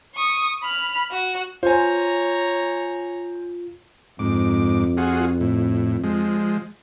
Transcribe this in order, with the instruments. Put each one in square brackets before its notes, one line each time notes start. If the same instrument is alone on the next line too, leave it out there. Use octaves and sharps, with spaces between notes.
[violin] C#6 D#6
B5 F6
F#4
[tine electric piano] F4 [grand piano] C5 G#5 [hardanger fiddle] C#5 A#5
[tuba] F2 [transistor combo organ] G#2 D6
[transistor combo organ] F4 F#4 G#4
A2
F3 G#3